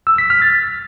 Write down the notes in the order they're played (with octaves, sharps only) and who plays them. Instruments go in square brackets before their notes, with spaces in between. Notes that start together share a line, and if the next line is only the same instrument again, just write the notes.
[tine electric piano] E6
B6
F6
A6